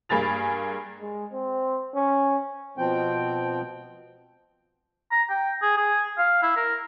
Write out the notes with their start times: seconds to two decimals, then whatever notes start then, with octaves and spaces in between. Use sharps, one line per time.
0.09 G2 A#3 G#4 B5 A6 F7
1.00 G#3
1.33 C4
1.95 C#4
2.78 B2 F3 C4 G5
5.11 A#5
5.30 G5
5.62 G#4
5.77 G#4
6.18 F5
6.43 E4
6.56 A#4